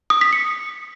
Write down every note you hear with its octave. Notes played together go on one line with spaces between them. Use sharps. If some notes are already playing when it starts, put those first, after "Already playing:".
D#6
B6
C#7